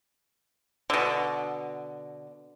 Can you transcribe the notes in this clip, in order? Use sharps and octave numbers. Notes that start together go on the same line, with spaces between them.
B2 D3